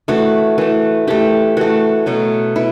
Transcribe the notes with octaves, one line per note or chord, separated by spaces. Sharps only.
E3 A3 F#4
E3 A3
E3 A3 G4
E3 A3 F#4
B2 F#3 A3
B2 E4